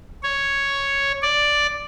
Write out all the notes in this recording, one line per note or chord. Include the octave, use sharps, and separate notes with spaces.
C#5
D5